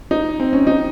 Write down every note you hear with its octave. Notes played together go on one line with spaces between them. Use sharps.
D#4
C4
C#4
D#4